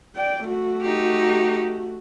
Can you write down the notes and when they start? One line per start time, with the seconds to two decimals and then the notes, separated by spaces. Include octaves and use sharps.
0.16 D5 G5
0.48 A3 F#4
0.82 D#4 G4